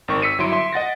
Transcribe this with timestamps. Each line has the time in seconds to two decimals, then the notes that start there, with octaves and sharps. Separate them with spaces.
0.08 G#1 D#3 C#6
0.22 E6 B6 C#7 D#7
0.38 G1 F#3 E4 C6 D7
0.52 E5 C6
0.73 D#5 F#5 A6 A#6